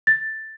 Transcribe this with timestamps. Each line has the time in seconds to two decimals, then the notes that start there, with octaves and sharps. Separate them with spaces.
0.07 A6